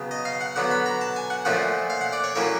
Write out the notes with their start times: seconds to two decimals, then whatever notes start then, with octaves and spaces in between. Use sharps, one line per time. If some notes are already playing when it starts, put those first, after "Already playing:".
Already playing: C#3 F#3 B3
0.11 D#5
0.25 F5
0.41 F#5
0.56 D3 F#3 B3 F#5
0.71 B5
0.86 A#5
1.01 A5
1.16 G#5
1.30 F#5
1.45 A#2 F3 A3 C#4 F4 F#5
1.90 F5
2.01 F#5
2.13 D5
2.24 C#5
2.35 A2 F#3 A#3 C#4 E4 C#5